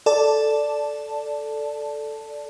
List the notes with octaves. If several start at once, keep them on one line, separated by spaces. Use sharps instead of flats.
A4 D5 A5